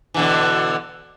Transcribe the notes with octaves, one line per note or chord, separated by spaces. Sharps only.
B2 D3 E3